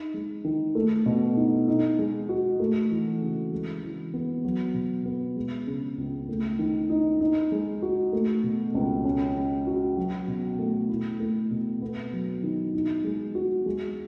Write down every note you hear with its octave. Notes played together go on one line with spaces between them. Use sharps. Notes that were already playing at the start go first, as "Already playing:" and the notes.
Already playing: D#4
G#3
D#3
A3
B2
D#4
D#4
G#3
F#4
A3
E3
C#3
G#3
E3
B3
F#3
B2
B3
G#3
C#3
C#2
A3
D#3
D#4
D#4
G#3
F#4
A3
B2
C#2
C#4
G#3
F#4
F#3
B2
A3
E4
A3
B2
B3
F#3
D#3
D#4
G#3
F#4
G#3